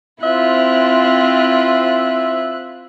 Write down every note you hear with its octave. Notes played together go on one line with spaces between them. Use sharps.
C4 E4 F4 C5 E5 F#6